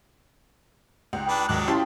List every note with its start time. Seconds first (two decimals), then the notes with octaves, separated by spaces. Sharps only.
1.13 C#2 D#4 G4 F#5
1.28 D4 B4
1.49 D#2 G#2 F#3 D4 A#4 D#5 D6 F#6
1.67 A3 C4 C#4 E4 F4 G4 A5 C6